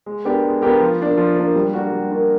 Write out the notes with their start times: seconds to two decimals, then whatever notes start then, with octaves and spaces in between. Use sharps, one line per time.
0.06 G#3
0.25 B3 D4 G4 A#4
0.43 G#3
0.62 B3 D4 G4 A#4
0.80 F3
1.00 A#3 D4
1.18 F3
1.37 A#3 D4
1.55 G3
1.73 A#3 D4 F#4 A#4
1.91 G3
2.10 A#3 D4 F#4 A#4